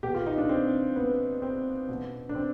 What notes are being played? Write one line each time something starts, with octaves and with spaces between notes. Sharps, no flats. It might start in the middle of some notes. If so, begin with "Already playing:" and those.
B2 G4
F4
D#4
D4
C4
B3
C4
B2
D4
C4